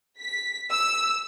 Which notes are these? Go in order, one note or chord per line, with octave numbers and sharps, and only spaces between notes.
B6
E6